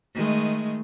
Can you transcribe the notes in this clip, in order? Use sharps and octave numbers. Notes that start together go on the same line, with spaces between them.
D#3 G#3 A3